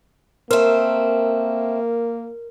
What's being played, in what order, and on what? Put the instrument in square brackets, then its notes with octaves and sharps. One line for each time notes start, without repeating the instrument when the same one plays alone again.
[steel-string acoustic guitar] A3 C4 [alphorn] A#3 [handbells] A#4